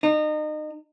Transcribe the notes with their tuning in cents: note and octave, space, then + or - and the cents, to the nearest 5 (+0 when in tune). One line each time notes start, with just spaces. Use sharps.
D#4 -30